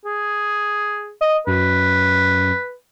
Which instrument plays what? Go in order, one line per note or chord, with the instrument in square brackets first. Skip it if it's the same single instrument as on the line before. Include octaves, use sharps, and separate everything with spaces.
[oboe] G#4
[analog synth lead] D#5
[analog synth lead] F#2 [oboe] B4